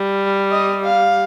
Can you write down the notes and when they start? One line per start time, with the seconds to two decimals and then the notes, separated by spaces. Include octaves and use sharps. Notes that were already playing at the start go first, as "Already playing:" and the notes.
Already playing: G3
0.51 D#5
0.84 F5